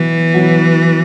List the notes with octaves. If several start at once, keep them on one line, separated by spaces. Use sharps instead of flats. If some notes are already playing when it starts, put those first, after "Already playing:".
Already playing: B2 E3 F#3 B3
B2 F#3 B3